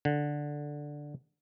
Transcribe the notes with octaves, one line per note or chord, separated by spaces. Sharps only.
D3